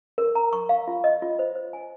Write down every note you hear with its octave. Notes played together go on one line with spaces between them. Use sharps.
A#4
A#5
C#6
F5
F4
D#5
F4
C5
C5
G#5